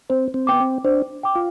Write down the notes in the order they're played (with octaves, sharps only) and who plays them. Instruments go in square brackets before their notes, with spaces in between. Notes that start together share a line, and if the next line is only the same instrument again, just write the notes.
[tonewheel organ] C4 [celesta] C5
[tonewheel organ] C4
[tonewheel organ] B3 [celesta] G5 D6
[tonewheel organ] C4
[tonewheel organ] D4 [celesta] C5
[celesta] G5 D6
[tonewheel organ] F4